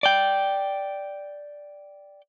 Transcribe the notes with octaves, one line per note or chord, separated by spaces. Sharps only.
D5 G5